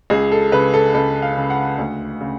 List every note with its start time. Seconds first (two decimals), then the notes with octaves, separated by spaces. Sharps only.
0.10 C#2 G#4
0.32 A4
0.52 C#3 B4
0.74 A4
0.94 C#2 A4
1.22 F5
1.36 C#3
1.50 F#5
1.78 D2
2.21 C#3